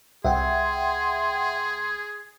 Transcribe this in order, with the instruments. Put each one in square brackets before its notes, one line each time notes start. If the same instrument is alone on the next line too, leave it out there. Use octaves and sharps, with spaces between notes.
[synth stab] C2 [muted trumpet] G#4 [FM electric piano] E5 F#5 G5 [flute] C6